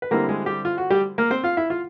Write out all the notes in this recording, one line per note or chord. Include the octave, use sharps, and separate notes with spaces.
B4
D3 G3 A#3 C4 E4 A#4
G#3 G#4
G3 G4
F4
F#4
G3 G4
A#3 A#4
C4 C5
F4 F5
E4 E5
F4 F5